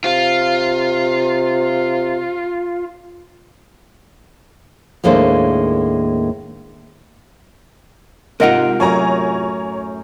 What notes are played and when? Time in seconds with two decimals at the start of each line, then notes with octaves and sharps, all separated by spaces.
0.04 C3 F4
5.04 D#2 A2 G#3 A#3 D4 C5
8.40 G#2 C3 F4 A#4 D#5 F#5 D7
8.80 F#2 A2 C#5 G#5 A#5